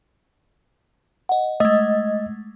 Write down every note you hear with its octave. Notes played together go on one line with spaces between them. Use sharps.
D#5 F#5
G#3 A3 D#5